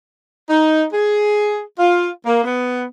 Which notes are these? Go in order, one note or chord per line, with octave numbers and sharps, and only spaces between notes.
D#4
G#4
F4
A#3
B3